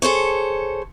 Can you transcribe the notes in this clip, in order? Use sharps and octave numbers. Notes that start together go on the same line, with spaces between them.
G#4 A4 C5 C#5